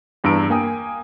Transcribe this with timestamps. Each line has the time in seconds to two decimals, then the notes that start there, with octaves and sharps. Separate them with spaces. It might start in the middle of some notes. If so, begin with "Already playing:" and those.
0.24 E2 G2 A#5 E6 D7
0.50 A#3 G5 G#5 D#6